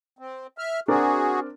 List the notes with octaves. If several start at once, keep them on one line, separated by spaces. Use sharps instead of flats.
C4
E5 F6
C4 D4 F#4 G#4 A#4